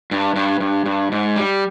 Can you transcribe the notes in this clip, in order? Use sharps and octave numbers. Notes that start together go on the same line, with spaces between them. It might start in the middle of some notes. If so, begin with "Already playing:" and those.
G2
G2
G2
G2
G#2
G3